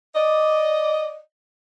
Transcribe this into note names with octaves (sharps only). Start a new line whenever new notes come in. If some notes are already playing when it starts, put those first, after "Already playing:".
D5 D#5